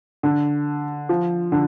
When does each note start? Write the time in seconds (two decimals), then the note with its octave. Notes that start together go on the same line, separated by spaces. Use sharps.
0.23 D3
1.09 F3
1.52 D3